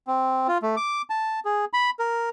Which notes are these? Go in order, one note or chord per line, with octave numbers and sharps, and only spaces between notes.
C4
F4
A3
D6
A5
G#4
B5
A#4